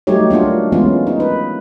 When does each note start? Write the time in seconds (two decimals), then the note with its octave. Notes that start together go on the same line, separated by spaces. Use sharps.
0.07 F#3 G3 A3 D#4 G4 C#5
0.30 A#3 D4 F4 F#4
0.72 E3 G#3 B3 C#4 F4
1.07 D#4
1.20 B4